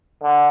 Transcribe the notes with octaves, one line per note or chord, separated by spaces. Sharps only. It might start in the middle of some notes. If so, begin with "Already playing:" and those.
D3